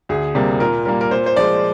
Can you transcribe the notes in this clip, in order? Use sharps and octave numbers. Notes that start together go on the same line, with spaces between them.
D2 G#4
C3 G3 A#3
A#2 A#4
G3 A#3 A#4
A#4
A#2 C5
C5
F3 G#3 D5